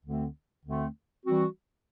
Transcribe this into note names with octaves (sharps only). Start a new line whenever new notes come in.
D2 D3 A3 C4
D2 D3 A3 C4
E3 G3 C4 F#4